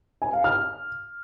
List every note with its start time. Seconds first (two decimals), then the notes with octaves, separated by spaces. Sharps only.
0.22 G#5
0.33 F5
0.44 F6